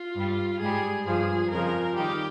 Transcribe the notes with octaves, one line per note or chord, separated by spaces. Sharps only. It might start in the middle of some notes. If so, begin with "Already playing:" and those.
Already playing: F4
G2 G3
G#2 G3 G#4
G2 F3 G#4
F2 C#3 F3 A#4
D#3 G3 G4